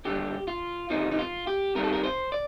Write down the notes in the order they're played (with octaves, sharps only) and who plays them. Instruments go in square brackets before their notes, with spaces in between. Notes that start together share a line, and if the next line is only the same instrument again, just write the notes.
[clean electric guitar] D#2 D3 G3 G4
F4
D2 C3 F3 D#4
D#4
F4
G4
C2 C3 D#3 G3 A#4
A4
A#4
C5
D5